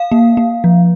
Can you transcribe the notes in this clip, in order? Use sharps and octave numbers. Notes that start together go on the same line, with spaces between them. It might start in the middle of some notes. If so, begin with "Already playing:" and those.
Already playing: F5
A#3
A#3
F3